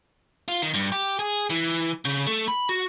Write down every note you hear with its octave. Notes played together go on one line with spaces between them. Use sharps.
F4
D#3
G2
G4
G#4
E3
C#3
A3
B5
F#4